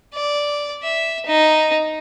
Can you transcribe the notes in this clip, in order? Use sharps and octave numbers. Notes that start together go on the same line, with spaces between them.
D5
E5
D#4